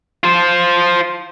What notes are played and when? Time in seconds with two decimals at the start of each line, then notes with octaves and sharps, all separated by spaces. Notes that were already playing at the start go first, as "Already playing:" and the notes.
0.24 F4 C5